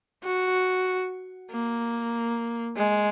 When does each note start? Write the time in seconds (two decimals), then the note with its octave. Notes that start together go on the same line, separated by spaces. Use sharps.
0.24 F#4
1.51 A#3
2.77 G#3